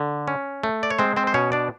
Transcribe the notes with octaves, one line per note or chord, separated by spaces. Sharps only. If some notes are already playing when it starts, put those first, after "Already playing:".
Already playing: D3
C#4
A3
D5
C#5
G#3 C4 C5
C4 C5
C5
B2 C#4 C#5
D4 D5